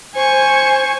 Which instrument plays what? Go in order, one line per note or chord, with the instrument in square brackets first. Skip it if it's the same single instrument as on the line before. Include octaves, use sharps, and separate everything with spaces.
[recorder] C5 [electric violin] G#5 C#6